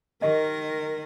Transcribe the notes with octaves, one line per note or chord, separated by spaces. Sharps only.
D#3 G4 A#4 D#5